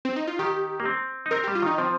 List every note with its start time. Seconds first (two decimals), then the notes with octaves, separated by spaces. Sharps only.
0.05 C4
0.16 D#4
0.27 F4
0.39 D#3 G4
0.80 A#3
0.85 C4
1.26 D#4
1.31 C4 A#4
1.44 G3 G4
1.55 F4
1.62 D#3 D#4
1.78 F3 C4